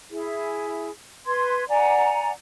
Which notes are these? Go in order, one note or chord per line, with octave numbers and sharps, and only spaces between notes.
E4 G#4
B4 C6 G#6
D5 F#5 G#5 A#5